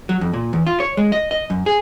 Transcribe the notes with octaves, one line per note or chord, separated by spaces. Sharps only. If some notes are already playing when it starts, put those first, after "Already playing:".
F#3
F2
A#2
E2
F4
C#5
G#3
D#5
D#5
F#2
G#4